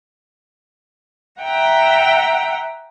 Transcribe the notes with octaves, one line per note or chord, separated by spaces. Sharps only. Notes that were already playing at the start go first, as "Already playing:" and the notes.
E5 F#5 G5 A#5